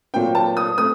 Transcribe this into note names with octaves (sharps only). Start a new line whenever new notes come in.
A#2 F#3 A3 C4 G5
A5
D#6
A3 C4 D#6